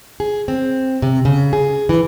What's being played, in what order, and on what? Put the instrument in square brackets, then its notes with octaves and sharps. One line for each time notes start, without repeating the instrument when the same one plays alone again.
[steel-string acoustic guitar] G#4
C4
C3
C#3
G#4
E3